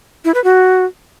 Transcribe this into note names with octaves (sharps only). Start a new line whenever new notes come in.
E4
B4
F#4